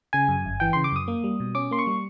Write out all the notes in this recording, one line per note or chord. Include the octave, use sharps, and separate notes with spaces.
C#3 G#5
F#2
G1
E3 G5
C#3 C6
D6
F#2 D#6
A#3
G3
B2
C#4 D6
A#3 C6
C#6
G3